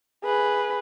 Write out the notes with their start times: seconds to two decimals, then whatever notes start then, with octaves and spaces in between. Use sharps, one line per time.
0.24 G#4 B4